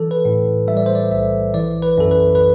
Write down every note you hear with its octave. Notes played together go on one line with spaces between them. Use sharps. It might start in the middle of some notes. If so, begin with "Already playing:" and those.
Already playing: E3 A4
B4
A2
G3 E5
D5
C5
D5
B1 E5
E3 D5
B4
F#2 A4
B4
B4